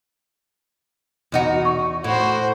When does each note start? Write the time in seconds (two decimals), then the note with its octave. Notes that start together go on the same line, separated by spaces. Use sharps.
1.32 E2 D#4 F#4
1.65 C#6
2.04 A2 F#4 C5